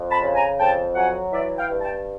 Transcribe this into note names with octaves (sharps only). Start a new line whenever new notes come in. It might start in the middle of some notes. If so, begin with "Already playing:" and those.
Already playing: F2
A5 B5
C#3
G#5 A#5
F2 G5 A5
F#3 F#5 G#5
E3 D5 E5
F5 G5
G2
G5 A5